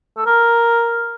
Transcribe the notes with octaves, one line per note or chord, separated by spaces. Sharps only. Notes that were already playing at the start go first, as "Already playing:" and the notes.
A4
A#4